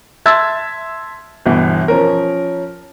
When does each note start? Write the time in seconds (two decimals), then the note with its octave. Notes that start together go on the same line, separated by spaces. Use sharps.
0.26 E5 A5 C6 E6 G#6 A6
1.46 G1 B2 E3
1.88 F3 C#4 A#4